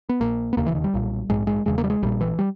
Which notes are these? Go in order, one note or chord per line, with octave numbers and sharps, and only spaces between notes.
B3
A#1 A#2 A#3
B3
E1 D#2 C#3 A#3
E3
D#3
G3
B1 A#2
A#1 G#2 G#3
G#3
E1 E2 C#3 G#3
A#3
G3
G#3
A#1 A#2 G3
E3
G3